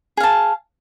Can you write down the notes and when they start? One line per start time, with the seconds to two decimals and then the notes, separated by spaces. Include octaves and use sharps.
0.17 G#4
0.20 F5
0.23 A5